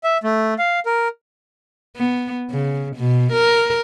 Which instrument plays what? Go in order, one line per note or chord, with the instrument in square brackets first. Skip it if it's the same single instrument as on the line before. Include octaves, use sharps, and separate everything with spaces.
[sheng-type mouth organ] E5
A3
F5
A#4
[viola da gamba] B3
C#3
B2
A#4